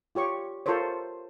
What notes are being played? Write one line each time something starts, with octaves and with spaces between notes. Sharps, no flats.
F4 G4 C#5 C#6
F4 A4 A#4 C5 C#5